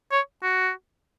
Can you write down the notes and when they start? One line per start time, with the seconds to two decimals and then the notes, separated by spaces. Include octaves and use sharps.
0.11 C#5
0.43 F#4